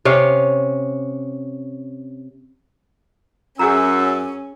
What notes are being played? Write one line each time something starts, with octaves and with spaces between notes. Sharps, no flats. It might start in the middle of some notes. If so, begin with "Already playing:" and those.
C3 C#4 F5
F#2 C#4 G#4 A#5 E6